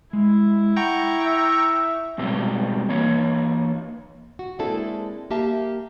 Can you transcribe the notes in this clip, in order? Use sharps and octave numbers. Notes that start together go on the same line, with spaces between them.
G#3 E4
F#5 G5 A#5 C#6
E5
G#2 B2 F#3 G3 C4 G4
E3 A#3 C#5
F#4
G#3 A#3 C4 D4 E4 A4
A#3 G4 E5 A5